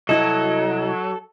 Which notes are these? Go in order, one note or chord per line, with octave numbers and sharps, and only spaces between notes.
C2 F#3 E4 F#4 A4 D#5